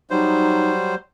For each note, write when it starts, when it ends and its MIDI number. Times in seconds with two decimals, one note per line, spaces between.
0.10 0.95 54
0.10 0.95 55
0.10 0.72 63
0.10 0.95 72